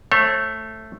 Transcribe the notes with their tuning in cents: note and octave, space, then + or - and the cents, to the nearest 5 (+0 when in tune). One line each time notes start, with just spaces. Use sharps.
A3 +0 C#5 -45